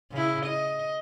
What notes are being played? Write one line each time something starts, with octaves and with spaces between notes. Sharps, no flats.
C#3 E4
D#5